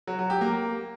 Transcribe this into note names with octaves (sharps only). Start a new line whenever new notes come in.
F#3
F#3
G4
A#3